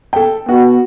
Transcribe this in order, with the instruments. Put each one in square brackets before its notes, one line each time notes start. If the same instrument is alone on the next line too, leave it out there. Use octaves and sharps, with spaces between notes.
[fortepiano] A4 G5
[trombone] B3 [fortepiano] F#4